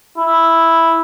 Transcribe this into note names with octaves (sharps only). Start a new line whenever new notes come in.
E4